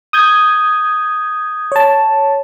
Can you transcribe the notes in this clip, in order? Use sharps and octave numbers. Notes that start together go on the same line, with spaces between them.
D#6 G6 G#6
C#5 A5